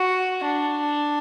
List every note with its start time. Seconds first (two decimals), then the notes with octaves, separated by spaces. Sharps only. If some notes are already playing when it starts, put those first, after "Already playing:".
Already playing: F#4
0.45 D4